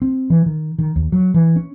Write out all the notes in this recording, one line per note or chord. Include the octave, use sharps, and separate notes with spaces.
C4
E3
D#3
D#3
D#2
F#3
E3
C#4